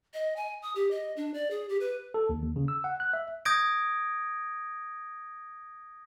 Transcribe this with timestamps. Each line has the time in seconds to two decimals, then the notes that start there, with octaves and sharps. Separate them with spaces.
0.14 D#5
0.36 G#5
0.62 D#6
0.76 G4
0.91 D#5
1.17 D4
1.34 D5
1.51 G#4
1.69 G4
1.80 B4
2.14 A4
2.29 D#2
2.42 D#2
2.56 C#3
2.68 E6
2.84 F#5
3.00 F#6
3.13 E5
3.45 D#6 G6 G#6 A#6 D7